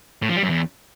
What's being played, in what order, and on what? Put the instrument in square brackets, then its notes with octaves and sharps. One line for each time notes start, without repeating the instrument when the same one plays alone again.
[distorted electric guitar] A2
F3
G3
F#2
E2